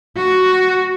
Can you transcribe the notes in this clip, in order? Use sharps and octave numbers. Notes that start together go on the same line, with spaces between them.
F#4